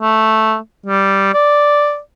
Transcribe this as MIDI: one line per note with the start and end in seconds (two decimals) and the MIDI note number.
0.02 0.56 57
0.86 1.31 55
1.34 1.98 74